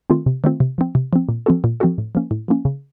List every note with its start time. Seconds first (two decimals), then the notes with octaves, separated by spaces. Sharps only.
0.10 D#3 A3 C4 F4
0.26 C3
0.44 D#3 A3 C4 F4
0.60 C3
0.78 F3 C4
0.95 C3
1.13 F3 C4
1.29 A#2
1.46 F3 C4 F#4 A4
1.64 A#2
1.80 F3 C4 F#4 A4
1.98 A2
2.15 F3 A#3 C#4
2.31 A2
2.48 F3 A#3 C#4
2.65 C#3